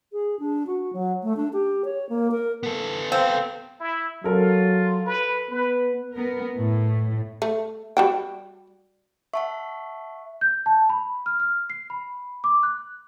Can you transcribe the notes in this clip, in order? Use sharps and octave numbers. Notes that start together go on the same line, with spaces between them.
G#4
D4
F#4
F#3
A3
D4
G4
C#5
A#3
A#4
B3 A4
C4 F5
E4
F#3 F4 A4 A#4
B4
B3 B4
B3 A#4
A2 A3
A3
G3 F#4 G5
E5 F#5 A5 C#6
G6
A5
B5
F6
F6
C7
B5
D6
F#6